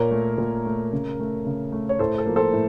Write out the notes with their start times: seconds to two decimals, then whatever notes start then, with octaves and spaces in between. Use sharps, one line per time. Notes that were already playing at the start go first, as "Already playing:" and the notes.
Already playing: A#2 A#4 C#5
0.11 A3
0.38 A#2
0.65 A3
0.93 C#3
1.20 A3
1.46 C#3
1.72 A3
1.89 C#5
1.99 A2 A4 C5
2.18 A4
2.26 F3 A#3
2.36 A4 C5
2.53 A2